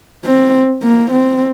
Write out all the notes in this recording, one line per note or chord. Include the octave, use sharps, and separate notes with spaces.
C4
A#3
C4